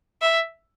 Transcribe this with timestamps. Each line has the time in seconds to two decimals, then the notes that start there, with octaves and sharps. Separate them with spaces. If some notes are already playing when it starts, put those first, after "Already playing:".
0.21 E5